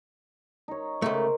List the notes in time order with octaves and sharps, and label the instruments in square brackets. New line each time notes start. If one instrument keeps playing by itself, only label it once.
[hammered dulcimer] D#4 C#5
[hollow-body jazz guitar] C#2 F#2 A3 [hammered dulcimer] A#4 C5